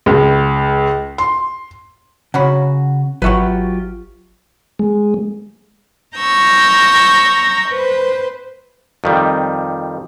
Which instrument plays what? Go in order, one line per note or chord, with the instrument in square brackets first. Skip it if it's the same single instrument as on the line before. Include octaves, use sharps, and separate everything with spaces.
[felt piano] C#2
C6
[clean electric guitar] C#3 [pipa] F#3 C#4 F#4 [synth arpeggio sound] F#5 B5
[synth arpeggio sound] G#1 C#6 [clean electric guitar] F#3 F4 G4 [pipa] B4 E5 F#5
[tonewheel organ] G#3
[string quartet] A#5 C#6 E6 G6
B4 C5
[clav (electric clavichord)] F2 D#3 G3